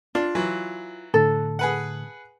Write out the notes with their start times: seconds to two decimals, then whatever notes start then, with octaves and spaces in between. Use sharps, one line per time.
0.15 D4 F4
0.35 E3 F#3
1.14 A2 D3 A4
1.59 G#4 B4 F#5